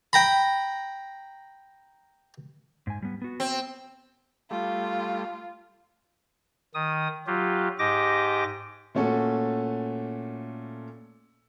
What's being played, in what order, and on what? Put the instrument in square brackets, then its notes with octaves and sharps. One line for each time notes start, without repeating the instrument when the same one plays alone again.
[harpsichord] G5 A#5 B5
[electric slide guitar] G#2 G#5
G3 B3
B3 F#4
[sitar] C4
[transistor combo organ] G3 A3 [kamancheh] F4
[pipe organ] D#3 D#6
F#3 F4 G4
G#2 G4 D#5 D6 A#6
[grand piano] A#2 A3 C#4 F#4 A4